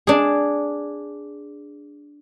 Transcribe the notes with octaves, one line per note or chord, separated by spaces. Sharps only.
D4 G#4